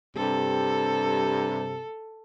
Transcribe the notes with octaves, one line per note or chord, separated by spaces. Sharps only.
G2 C3 A4